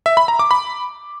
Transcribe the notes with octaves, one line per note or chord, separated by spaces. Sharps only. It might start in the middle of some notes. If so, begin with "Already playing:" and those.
E5
B5
A#5
D6
B5